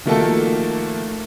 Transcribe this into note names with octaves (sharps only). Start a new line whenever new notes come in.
D#3 F3 A3 A#3 F#4 A4